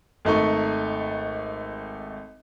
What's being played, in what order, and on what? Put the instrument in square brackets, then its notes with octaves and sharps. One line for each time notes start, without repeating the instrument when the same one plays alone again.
[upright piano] G#1 A3 D#4 C#6